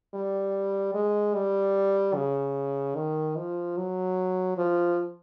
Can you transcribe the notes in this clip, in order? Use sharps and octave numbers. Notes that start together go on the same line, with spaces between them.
G3
G#3
G3
C#3
D#3
F3
F#3
F3